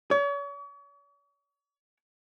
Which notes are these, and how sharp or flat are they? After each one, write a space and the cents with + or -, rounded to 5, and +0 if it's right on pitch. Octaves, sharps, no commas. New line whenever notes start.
C#5 +40